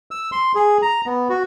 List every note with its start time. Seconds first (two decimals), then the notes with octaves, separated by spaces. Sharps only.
0.11 E6
0.32 C6
0.55 G#4
0.82 A#5
1.06 B3
1.29 F#4